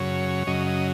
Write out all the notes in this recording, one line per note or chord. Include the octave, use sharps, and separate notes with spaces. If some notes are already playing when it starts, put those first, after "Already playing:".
Already playing: F#2 C#3 F#3 C#5
F#2 C#3 F#3 D#5
D#5